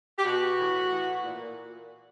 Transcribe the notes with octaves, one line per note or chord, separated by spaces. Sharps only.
G4
B2 F#4
A2 E3
A2 E3
A#2